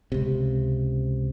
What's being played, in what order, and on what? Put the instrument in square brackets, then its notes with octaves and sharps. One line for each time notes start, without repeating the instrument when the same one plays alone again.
[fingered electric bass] C#2 C3